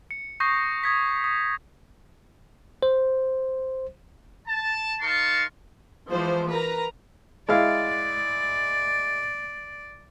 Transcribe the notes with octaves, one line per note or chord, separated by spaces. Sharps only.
C#7
C#6 D#6 G6 A#6 C7
D#6 G#6 B6
D#6
C5
A5
D#4 A#4 F5 A5 C6 C#6
E3 F3 G#3 C5
A#4 B4 A#5
G#3 E4 D5 F5